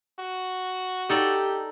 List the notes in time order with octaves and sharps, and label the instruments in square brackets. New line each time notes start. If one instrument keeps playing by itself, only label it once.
[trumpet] F#4
[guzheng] D#4 A4 D5 [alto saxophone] G4